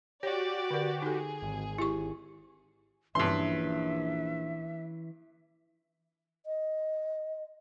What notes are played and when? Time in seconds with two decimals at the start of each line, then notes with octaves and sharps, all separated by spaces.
0.23 F#4 G4 C#5 D5 D6
0.70 D3 A#4
1.02 D#4 G#4 A4
1.42 G#1
1.78 E4 G4 C#6
3.15 A#1 G2 E3 C#4 E5 C6
6.46 D#5